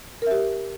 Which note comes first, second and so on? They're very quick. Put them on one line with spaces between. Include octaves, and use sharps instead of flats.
A#4 E5 G4